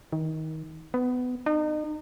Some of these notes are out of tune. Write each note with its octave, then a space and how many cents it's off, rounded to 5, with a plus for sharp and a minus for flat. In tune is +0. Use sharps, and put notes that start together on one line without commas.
D#3 +25
B3 +20
D#4 -35